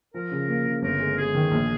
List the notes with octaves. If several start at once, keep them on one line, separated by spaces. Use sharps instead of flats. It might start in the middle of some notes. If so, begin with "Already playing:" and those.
F3 A#4
C#3
A#3
C#3
G1 A#4
G#3
G#3 G#4
D#3
A#1